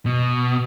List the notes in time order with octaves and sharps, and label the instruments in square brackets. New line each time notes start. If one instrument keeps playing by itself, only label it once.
[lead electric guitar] B2